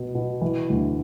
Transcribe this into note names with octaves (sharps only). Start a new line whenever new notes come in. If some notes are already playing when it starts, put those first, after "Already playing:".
Already playing: B2 B3
B2
E3
D2